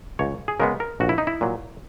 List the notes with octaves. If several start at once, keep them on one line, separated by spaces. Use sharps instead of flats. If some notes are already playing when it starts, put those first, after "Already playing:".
C#2 C#5
G#4
C#3 G#3 B3 A#4
A#4
A#1 F#4
E4
D#4
E4
A#2 F#3